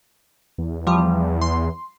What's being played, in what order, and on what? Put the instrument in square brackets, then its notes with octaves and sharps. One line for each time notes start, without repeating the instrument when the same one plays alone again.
[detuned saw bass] E2
[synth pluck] F3 G3
C6